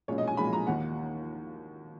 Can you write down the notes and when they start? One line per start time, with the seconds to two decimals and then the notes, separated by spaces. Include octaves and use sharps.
0.08 B1 A#2 G#3 C#4 C#5
0.18 D#5
0.28 G#5
0.37 B1 A#2 G#3 C#4 B5
0.53 A#5
0.67 D#2 D#3 A#3 D#4 F#5